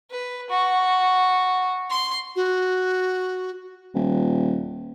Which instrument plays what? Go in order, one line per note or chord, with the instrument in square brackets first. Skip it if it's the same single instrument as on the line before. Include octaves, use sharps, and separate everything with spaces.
[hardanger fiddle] B4
F#4
C6
[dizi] F#4
[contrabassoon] D#1